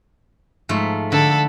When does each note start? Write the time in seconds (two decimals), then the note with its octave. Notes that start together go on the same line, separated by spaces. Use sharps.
0.69 G#2 F3 A3
1.12 D3 A4 B5